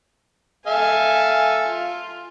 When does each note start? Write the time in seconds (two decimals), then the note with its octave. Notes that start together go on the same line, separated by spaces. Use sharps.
0.67 A4 E5 F5 G#5
1.66 F4